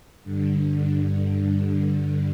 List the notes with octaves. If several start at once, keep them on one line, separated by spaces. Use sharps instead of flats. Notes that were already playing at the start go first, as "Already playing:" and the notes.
G2 D3